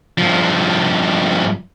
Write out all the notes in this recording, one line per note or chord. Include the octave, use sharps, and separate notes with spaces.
G2 F3